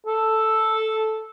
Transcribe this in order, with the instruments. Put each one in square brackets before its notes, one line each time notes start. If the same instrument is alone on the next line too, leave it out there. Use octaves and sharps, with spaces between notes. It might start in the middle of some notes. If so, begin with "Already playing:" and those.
[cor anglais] A4